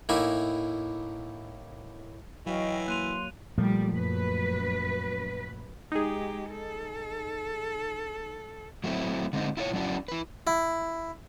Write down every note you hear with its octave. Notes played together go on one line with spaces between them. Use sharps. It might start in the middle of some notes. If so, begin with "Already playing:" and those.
A2 A#3 D#4 E4 E5 G#5
E3 F#3 D#5 F5 G5 C#6
A#3 C6 F#6 D#7 F7
A#2 F3 G3 A3
F#2 B4
G#3 D#4 G4 G#4
A4
F#3 A3 C4 E4
D3 G#3 C4 D#4
E4 F4 A#4 C#5
F#3 C#4 D4 E4 F#4
E4 B4
E4